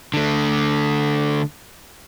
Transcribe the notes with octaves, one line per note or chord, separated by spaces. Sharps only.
D3 A3